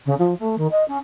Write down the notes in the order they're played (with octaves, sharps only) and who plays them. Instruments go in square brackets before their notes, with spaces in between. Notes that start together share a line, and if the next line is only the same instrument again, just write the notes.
[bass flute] C#3
F3
A3
D#3
D#5
C#4